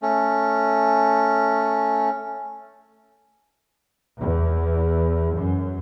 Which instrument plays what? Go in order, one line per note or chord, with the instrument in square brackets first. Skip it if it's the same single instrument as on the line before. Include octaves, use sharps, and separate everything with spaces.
[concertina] A3 C#4
[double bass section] E2
F#2